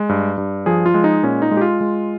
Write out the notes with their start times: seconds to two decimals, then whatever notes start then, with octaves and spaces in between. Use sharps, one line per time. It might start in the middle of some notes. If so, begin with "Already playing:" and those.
Already playing: G#3
0.09 G2
0.38 G2
0.66 F3 G#4
0.86 F4
0.94 G#3
1.04 D#4
1.23 A#2 C#4
1.42 D#4
1.51 G#3
1.57 G4
1.61 F4
1.81 G#3